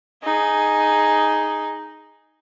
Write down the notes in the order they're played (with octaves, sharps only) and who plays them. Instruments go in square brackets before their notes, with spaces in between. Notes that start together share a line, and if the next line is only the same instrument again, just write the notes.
[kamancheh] D#4 G#4